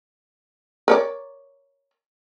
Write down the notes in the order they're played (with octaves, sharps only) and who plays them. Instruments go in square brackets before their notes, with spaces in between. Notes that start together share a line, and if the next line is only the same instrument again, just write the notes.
[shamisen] A#4 C#5 D5